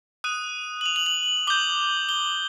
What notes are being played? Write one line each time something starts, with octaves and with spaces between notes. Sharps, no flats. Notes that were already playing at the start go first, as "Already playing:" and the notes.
D#6 F#6 D#7
F#7
F7
F#7
F#7
D6 G6 G7
G7